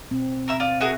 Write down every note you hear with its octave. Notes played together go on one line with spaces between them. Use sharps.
B2 C4
A#4 E5 E6
F4 D5
F#4 G#4 A#4 E5